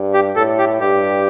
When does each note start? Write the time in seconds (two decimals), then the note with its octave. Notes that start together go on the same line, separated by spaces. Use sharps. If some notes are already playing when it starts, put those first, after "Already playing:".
Already playing: G2
0.14 G4
0.36 A2 A4
0.58 G4
0.81 G2 G4